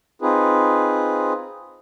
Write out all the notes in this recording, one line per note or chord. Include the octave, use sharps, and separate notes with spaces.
C4 D#4 F4 G#4 B4